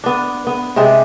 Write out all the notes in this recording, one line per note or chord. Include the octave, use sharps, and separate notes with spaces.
B3 D4
B3
C3 G#3 D4 G4